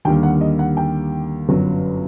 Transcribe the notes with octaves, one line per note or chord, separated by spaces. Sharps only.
D#2 D3 G3 A#3 G5
F#5
D#5
F#5
G5
G1 F#2 F#3